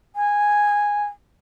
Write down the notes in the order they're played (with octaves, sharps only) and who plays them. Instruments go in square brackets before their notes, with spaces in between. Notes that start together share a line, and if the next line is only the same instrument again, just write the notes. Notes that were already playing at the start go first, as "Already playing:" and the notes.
[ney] G#5